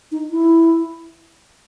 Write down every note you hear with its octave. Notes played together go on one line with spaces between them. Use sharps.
D#4
E4